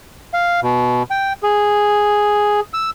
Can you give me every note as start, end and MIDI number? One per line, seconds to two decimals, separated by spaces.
0.34 0.60 77
0.63 1.03 47
1.11 1.33 79
1.43 2.60 68
2.74 2.90 88